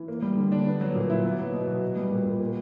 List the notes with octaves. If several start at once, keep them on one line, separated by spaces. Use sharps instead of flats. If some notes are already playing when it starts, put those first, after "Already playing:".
Already playing: E3
A#3
G3
D3
D4
B3
F#3
A#2
E4
B3
F#3
B2
F#4
B3
G3
A#2
A#2
A#3